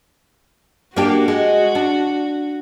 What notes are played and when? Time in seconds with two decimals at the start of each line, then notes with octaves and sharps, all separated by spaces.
0.96 A#3 D4 F#4 G4
1.28 G#3
1.75 D4